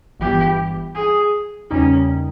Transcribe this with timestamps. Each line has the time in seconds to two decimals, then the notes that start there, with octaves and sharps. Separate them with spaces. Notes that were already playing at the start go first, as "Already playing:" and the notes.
0.20 G1 G2 E3 G3 B3 G4
0.95 G#4
1.71 E2 C#3 G3 A#3 C#4 D#4